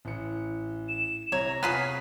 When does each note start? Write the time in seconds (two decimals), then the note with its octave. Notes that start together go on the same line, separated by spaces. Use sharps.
0.05 A1 C#7
0.88 E7
1.32 C2 C3 C#5 A#5 E7
1.63 C3 B3 F4 G#4 C#5 B6